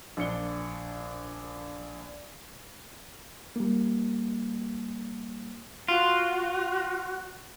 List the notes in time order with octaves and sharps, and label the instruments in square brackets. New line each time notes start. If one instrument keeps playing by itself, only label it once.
[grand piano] A#1 D4 C#7 G7
[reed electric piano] G3 A#3
[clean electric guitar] F4 [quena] F#4